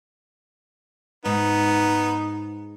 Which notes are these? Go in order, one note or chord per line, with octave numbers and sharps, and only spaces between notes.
G#2 B3 D#4